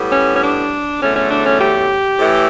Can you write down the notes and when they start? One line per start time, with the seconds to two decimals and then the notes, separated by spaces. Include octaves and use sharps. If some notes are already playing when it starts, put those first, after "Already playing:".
Already playing: A2 G3 B3
0.10 C#4
0.35 C#4
0.40 D4
1.00 E2 D3 F#3 A3 C#4
1.15 C#4
1.29 D4
1.44 C#4
1.59 G4
2.19 A2 E3 A3